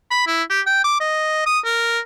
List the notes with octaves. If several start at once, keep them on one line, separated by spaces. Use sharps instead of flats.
B5
E4
G4
G5
D6
D#5
D#6
A#4